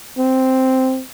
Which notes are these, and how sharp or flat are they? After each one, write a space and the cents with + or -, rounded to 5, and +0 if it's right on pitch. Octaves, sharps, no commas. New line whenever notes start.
C4 -5